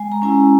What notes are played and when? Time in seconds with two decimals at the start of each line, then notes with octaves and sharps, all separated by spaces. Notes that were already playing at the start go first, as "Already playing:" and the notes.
Already playing: G#3 G#5
0.12 A#5
0.22 C#4 E4 G#5